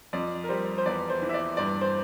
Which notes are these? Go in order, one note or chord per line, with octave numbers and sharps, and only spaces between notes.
F2 D5
A#4
G3 C5
C5
E2 D5
C5
E3
E5
D5
G2 D5
C5